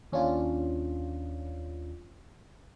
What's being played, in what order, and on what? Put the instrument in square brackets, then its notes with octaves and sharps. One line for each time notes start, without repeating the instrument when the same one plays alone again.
[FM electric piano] D#2 C#4 D4 F4